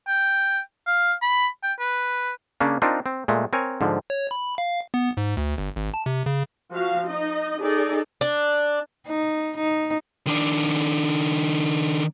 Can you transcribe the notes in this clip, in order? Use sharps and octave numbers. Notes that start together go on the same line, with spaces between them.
G5
F5
B5
G5
B4
C#3 A#3 C#4 D4
C4 D4 D#4 F4 A#4
C4
A#2 G#3 A3
C4 A#4 C#5 G#5
G#2 D3 F3
C#5
B5
F5
B3
G#2
D2
G1
G#1
A5
C3
C#3
F3 F#4 F5
D#4 D#5
D#4 G#4 A4 D5
D4
D#4
D#4
D#3 D4